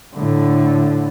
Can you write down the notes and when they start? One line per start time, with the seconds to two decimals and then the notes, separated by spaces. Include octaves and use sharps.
0.14 A2 D3